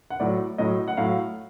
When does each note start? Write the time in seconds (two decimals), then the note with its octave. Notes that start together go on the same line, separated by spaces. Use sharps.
0.10 F#5
0.20 A2 F#3 D5
0.58 A2 F#3 D#5
0.88 F#5
0.97 A2 F#3 F5